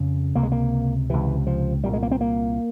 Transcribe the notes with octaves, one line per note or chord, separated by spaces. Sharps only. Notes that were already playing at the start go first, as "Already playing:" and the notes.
Already playing: F2 C#3
C#2 C3 A#3
G#3
A#3
C#2 C3 E3
F3
C2 A#2 G3
G#3
A#3
C4
A#3